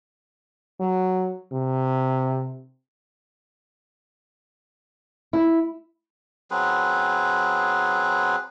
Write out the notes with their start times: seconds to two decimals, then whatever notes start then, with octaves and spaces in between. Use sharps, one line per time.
0.80 F#3
1.52 C3
5.33 E4
6.51 F#3 C4 G#4 B4